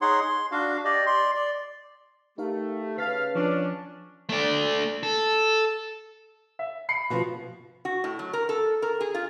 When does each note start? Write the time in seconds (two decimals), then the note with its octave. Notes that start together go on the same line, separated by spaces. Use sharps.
0.02 D#4 G#4 C#5 F#5 C6
0.21 C6
0.51 D4 F#4 F5
0.84 G4 D5 D#5
1.06 D5 C6
1.34 D5
2.38 A3 D#4 G4 A#4 F5
2.98 C#3 B4 F5 A5 A6 B6
3.35 F3 C#4 D4
4.29 A3 D5
5.03 A4
6.59 E5
6.89 B5 C7 C#7
7.10 B2 F3
7.85 F#4
8.04 A2
8.19 F#3
8.33 A#4
8.49 A4
8.82 A#4
9.01 G#4
9.14 F4